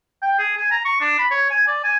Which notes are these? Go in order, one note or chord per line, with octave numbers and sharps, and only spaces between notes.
G5
G#4
G#5
A#5
C#6
D4
B5
C#5
G#5
D5
G#5